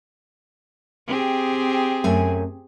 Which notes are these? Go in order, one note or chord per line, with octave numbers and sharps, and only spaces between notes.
C4 G4 G#4
F#2 A3 G#5